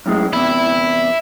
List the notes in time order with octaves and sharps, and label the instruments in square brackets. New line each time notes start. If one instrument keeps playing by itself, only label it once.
[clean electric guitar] F#2 A2 G#3
[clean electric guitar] E2 C3 [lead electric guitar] E5 B5